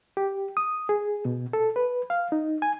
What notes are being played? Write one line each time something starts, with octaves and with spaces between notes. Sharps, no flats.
G4
D#6
G#4
B2
A4
B4
F5
D#4
G#5